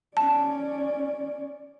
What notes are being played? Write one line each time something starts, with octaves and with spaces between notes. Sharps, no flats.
C#4 D5 A5